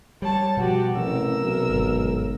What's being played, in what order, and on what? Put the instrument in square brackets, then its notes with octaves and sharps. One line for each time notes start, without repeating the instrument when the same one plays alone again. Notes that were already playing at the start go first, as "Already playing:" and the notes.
[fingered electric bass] G3 [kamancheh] C#5 A5
[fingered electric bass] B2 F3 G3 [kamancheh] F#4 G4
[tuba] A1 [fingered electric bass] C3 [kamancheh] A#4 E6
[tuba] B1
[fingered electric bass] G1 G#2